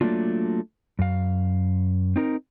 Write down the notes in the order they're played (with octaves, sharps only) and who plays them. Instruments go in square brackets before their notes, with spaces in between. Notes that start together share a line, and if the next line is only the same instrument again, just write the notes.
[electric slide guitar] F#3 A3 A#3 D4 F4
F#2 F5
C4 D#4 A#4